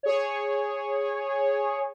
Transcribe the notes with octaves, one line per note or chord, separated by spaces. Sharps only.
G#4 C#5